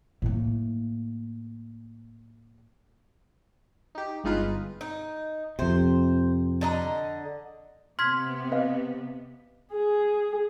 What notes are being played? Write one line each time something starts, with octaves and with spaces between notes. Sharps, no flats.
A2 A#3
D#4 G4
G1 G#3 D#4 F4 B4
D#4
F2 C3 C5
D3 D#5 A#5
C3 B3 C6 F6 G#6 B6
B4 D#5 F5
G#4